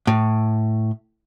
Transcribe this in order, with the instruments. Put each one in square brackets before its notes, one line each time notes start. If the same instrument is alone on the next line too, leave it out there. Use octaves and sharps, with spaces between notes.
[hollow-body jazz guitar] A2